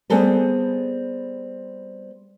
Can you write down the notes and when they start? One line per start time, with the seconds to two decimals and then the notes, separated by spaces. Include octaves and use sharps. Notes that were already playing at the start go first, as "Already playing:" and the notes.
0.10 G3 B3 C4 G#4 A4 B4